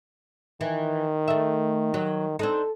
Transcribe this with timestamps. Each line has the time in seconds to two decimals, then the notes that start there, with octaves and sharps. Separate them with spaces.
0.61 D#3 E3
1.28 A3 E5
1.94 F#3
2.39 C4 D4 D#4 A4